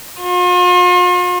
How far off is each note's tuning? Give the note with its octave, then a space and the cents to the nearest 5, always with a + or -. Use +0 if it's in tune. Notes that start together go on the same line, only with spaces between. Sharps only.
F4 +45